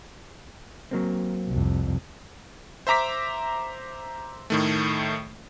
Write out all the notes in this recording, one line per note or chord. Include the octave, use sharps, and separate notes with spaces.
F#3 A#3 C4
C2 F2
C5 E5 A#5 D6 B6
A2 D#3 A3